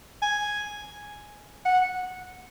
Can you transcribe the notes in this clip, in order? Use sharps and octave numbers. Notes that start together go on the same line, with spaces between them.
G#5
F#5